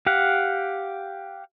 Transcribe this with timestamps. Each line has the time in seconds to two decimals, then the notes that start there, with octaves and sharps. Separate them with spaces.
0.06 G4 F5 F#5